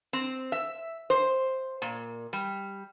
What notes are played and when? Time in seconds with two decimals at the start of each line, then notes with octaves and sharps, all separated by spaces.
0.13 C4
0.52 E5
1.10 C5
1.82 A#2
2.33 G3